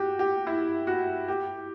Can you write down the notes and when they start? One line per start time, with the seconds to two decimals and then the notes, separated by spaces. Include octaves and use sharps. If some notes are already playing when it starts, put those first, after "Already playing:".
Already playing: F#4 G4
0.19 G4
0.47 E4
0.87 F#4
1.28 G4